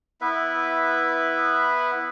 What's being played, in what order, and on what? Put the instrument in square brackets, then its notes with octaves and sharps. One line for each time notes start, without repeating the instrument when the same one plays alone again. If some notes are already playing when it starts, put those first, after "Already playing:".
[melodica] B3 E4 B4 E5